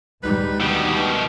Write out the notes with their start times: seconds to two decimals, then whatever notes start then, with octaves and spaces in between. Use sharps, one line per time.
0.23 D2 G3 G#3 D#4 B4
0.61 B2 D#3 G4